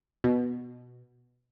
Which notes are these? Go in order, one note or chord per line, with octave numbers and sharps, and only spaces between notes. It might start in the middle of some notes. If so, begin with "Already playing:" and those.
B2